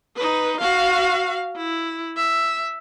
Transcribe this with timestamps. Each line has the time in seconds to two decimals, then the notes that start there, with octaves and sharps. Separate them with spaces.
0.16 D#4 B4
0.60 F#4 F5
1.57 E4
2.17 E5